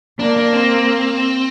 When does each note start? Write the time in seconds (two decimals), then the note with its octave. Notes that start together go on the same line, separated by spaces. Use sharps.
0.20 A#3 D4
0.37 D4
0.53 C4